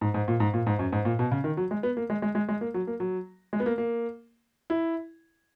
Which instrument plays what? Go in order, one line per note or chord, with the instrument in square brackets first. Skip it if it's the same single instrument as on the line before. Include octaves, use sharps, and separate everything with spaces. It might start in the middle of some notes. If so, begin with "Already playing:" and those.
[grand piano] G#2
G#2
A#2
G#2
A#2
G#2
F#2
G#2
A#2
B2
C#3
D#3
F#3
G#3
B3
A#3
G#3
G#3
G#3
G#3
A#3
F#3
A#3
F#3
G#3
B3
A#3
A#3
E4